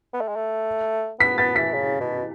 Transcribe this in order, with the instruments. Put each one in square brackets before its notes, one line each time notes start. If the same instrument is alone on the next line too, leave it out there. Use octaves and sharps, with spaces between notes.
[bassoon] B3
A3
G#3
A3
[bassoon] B3 [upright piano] B6
[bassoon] B3 [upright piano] A6
[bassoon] E3 [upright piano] B6
[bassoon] C#3
B2